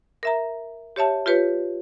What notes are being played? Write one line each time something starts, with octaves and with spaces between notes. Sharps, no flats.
A#4 E5 A#5
G4 C#5 E5 A5
F4 G4 B4 C#5